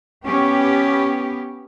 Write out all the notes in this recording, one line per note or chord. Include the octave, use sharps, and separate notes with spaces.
B3 C#4 G4